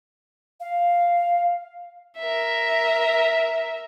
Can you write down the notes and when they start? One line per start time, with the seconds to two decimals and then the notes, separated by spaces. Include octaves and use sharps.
0.60 F5
2.18 A#4 E5